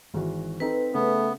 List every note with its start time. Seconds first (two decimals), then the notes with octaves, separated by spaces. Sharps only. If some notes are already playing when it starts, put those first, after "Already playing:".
0.14 G#1 E3 F#4
0.60 C4 D#4 A4 B4
0.94 C#3 A3 B3